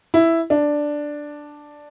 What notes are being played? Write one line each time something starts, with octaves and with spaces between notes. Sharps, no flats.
E4
D4